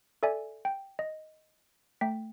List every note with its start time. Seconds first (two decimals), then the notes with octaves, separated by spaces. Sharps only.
0.23 A4 D5 E5 G#5
0.65 G5
0.99 D#5
2.01 A3 G5 B6